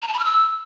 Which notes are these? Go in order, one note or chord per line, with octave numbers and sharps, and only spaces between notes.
A#5
A5
B5
F6
E6